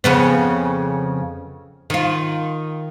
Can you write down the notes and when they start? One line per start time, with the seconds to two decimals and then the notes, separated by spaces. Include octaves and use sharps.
0.04 F2 C#3 B3
1.90 D#3 F4